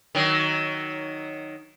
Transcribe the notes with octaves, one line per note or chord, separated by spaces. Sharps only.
D#3 F#3